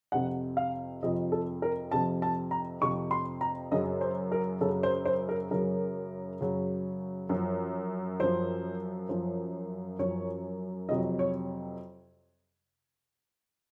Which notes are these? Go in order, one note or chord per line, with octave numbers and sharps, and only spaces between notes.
F2 C3 F3 F#5
F5
F2 C3 F3 D#5
A4
A#4
F2 C3 F3 A5
A5
A#5
F2 C3 F3 C#6
C6
A#5
F#2 C#3 F#3 D#5
C5
A#4
F#2 C#3 F#3 A4
C5
C5
A#4
F#2 C#3 F#3 A#4
F#2 C#3 F#3
F#2
F3
F#2 F3 C5
F#2 F3
F#2 F3 C#5
F2 C3 F#3 D#5
C#5